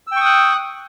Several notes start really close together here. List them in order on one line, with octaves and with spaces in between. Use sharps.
E6 G5 C#6 D#6 F#6